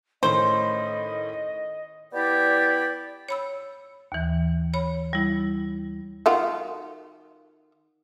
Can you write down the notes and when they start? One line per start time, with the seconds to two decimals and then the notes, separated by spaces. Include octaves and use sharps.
0.23 A2 D#3 C#4 C5 D#5
2.13 B3 E4 G4 D5
3.29 C#5 B5 E6
4.12 D#2 E3
4.74 C#5 B5
5.13 G3 E4
6.26 D#3 F4 F#4